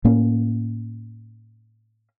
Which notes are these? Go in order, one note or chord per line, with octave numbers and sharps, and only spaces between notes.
A2 A#3 C#4